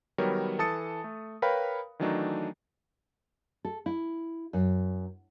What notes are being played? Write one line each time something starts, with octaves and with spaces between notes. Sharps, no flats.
D#3 F#3 G3 B3 A#4 C#5
E3 A4 A5 D#6 A6 C#7
A3
A#4 B4 C#5 F5 G5 B5
D#3 E3 F#3 A3 D4 D#4
A4
E4
F#2